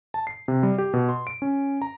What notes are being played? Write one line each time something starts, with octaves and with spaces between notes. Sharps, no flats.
A5
C7
C3
G3
G4
B2
C6
D7
C#4
A#5